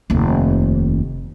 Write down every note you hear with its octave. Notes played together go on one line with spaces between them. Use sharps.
F1 D#2